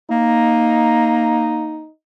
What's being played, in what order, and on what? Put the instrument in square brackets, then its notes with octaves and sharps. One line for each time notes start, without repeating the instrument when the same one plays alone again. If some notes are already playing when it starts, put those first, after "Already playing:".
[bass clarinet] A#3 [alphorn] D#4